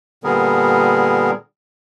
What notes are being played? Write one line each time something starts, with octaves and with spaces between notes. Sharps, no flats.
A#2 D3 G3 B3 G#4 A#4